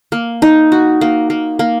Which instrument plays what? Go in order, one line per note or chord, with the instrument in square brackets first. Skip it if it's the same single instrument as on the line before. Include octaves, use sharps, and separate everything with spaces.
[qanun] A#3
D#4
F#4
A#3
A#3
A#3